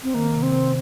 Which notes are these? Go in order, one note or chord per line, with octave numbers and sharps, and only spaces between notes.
C4
D#3 A#3
C3
C4
C3